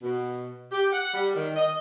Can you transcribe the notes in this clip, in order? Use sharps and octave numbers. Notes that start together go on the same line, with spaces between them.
B2
G4
F#5
G3
D#3
D#5